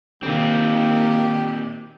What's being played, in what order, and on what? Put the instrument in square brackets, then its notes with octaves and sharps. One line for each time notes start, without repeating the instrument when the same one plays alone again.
[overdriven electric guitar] A#2 C4 [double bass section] D#3 [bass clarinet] A#3 [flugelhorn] G4